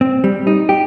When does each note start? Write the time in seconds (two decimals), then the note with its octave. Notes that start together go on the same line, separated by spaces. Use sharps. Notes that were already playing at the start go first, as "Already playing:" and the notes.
0.01 C4
0.24 G3
0.47 D#4
0.69 G4